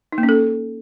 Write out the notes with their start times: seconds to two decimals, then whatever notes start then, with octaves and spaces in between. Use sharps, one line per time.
0.12 D#4
0.18 A#3
0.23 C#4
0.29 A4